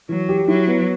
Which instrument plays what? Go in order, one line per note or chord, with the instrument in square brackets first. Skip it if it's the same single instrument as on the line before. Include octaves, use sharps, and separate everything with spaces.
[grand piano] E3 [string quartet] F#3
[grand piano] G4
[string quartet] F#3 [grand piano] E4
[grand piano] B3